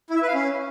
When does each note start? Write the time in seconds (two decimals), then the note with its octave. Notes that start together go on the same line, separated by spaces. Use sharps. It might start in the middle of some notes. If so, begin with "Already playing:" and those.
0.10 E4
0.16 E5
0.22 B4
0.28 F5
0.34 C#4